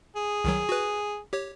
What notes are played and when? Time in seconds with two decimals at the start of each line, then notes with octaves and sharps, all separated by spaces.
0.16 G#4
0.44 C2 D#3 F#3
0.69 F#4 B4
1.33 G4 C#5